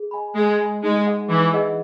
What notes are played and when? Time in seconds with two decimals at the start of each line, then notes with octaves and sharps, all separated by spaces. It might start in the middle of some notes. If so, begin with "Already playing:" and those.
Already playing: G#4
0.11 D#5 G#5 B5
0.35 G#3 G#4
0.59 D#5 G#5 B5
0.83 G#3 D#4
1.06 G#4 D#5 F#5
1.29 E3 D#4
1.53 G#4 D#5 F#5